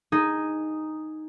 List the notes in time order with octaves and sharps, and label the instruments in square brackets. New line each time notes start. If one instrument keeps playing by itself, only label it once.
[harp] D#4 G#4